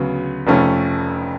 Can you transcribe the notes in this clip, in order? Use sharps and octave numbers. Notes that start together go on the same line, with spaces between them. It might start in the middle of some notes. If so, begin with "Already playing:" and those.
Already playing: D2 C#3 F#3 B3
F1 F2 F3 A3 C#4